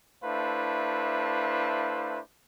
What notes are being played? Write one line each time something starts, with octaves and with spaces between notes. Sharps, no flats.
A3 D4 E4 B4 C5 F5